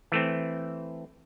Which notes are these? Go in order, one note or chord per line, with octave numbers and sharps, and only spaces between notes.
E3 A3 C4